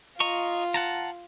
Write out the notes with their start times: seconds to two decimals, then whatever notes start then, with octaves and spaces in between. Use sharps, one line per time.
0.20 F4 D#5 A#5 C#6
0.74 F#5 A5 A#5